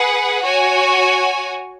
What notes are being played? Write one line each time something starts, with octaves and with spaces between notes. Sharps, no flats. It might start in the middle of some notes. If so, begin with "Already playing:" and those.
Already playing: G#4 B4 F#5
F#4 C#5 G#5